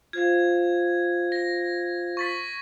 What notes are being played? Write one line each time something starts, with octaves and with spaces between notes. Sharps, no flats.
F4 C5 F5 G#6
A#6
C#6 A6 B6